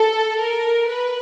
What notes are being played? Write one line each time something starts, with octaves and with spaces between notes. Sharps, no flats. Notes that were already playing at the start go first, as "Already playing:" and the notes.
Already playing: A4
A#4
B4